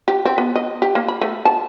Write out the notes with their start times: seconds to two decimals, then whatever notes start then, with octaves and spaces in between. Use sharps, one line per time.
0.08 G4
0.25 C4
0.38 B3
0.56 D#5
0.82 G4
0.95 A#3
1.08 B5
1.21 A3
1.45 A5